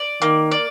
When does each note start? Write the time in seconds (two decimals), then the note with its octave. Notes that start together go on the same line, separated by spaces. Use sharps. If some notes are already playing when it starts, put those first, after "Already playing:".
Already playing: D5
0.22 D#3 A#3
0.51 D5